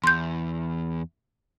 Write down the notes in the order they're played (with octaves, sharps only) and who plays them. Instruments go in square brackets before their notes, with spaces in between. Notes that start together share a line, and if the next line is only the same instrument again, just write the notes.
[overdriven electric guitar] E2 [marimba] C6 G6